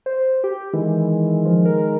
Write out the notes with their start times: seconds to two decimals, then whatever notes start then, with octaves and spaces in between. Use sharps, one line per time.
0.06 C5
0.44 G4
0.73 D#3 E3 G#3
1.45 F3
1.65 A#4